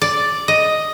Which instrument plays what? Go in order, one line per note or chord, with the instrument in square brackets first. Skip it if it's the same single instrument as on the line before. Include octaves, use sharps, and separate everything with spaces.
[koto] D5
D#5